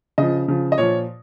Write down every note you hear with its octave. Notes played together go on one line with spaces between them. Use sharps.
C#3 F3 D#5
C#3 F3
D#5
A#2 F3 C#5